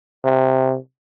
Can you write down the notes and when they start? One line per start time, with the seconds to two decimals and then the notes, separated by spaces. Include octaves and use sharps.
0.24 C3